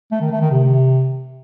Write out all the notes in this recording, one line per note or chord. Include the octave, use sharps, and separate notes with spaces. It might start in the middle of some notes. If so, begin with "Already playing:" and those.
A3
D#3
A3
D#3
C3